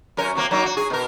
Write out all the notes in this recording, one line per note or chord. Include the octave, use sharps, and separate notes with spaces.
F#2 C#4 A#4
C3 F#3 A#3
F#3 A#3 D#4
F#4
G#4
B2 A#4